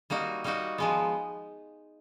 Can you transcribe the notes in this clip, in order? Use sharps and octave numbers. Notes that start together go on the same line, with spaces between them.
G3 A#3 D#4 F#4
G3 A#3 D#4 F#4
F3 G#3 B3